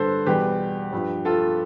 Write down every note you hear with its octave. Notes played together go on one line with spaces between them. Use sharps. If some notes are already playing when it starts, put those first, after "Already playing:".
Already playing: G2 D3 G3 A4 B4 C5
E2 B2 G3 G4 B4
G2 F3
F4 A4